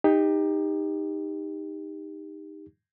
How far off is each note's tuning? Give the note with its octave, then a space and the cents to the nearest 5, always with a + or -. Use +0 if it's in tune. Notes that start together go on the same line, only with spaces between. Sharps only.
D#4 +0 G4 +25